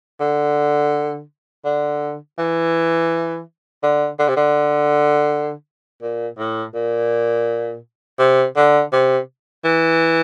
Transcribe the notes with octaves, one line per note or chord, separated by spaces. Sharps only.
D3
D3
E3
D3
D3
C3
D3
A#2
A2
A#2
C3
D3
C3
E3